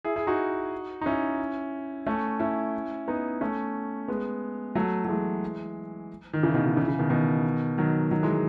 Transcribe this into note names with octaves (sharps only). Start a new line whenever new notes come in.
E4 G#4
E4 G#4
D#4 F#4
D#4
C#4 E4
A3 C#4
C#4 E4
B3 D#4
A3 C#4
G#3 B3
F#3 A3
F#3
E3 G#3
D#3
C#3 E3
B2 D#3
C#3
C#3 E3
C#3
B2 D#3
B2 D#3
D#3 F#3
D#3 F#3
E3 G#3
G#3